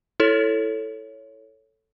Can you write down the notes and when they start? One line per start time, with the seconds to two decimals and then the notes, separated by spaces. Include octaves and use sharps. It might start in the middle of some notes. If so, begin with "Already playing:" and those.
0.20 E4 A4 C#5